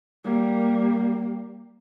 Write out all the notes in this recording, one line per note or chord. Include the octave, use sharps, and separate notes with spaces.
G3 A#3